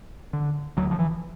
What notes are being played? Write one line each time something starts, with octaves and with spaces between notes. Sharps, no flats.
D3
D2 F#3
F3
E3